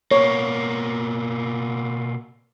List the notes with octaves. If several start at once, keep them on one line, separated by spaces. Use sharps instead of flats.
B2 A#3 C#5